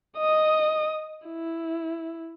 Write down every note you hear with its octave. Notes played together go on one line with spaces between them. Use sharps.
D#5 D#6
E4